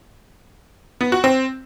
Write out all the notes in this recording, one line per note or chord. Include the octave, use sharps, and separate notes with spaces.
B3
F#4
C4